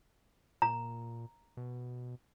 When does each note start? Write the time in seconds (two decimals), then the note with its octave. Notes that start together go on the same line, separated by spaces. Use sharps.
0.62 A#2 A#5
1.57 B2